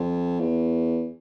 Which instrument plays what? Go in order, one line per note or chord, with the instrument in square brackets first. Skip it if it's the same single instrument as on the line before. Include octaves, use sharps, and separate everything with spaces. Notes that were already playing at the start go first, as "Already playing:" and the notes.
Already playing: [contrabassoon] F2
E2